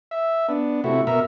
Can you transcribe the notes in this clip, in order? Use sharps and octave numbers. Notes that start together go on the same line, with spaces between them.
E5
B3 D4
C3 A3 E4 F#4
B2 A#4 E5